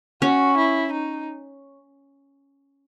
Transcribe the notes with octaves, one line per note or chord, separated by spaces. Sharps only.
C#4 F#4
E4
D#4